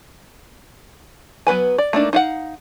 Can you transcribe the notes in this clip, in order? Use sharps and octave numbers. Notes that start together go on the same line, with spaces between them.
F#3 B3 B4 G#5
D5
A3 A#3 D4 D#4
D#4 F5 F#5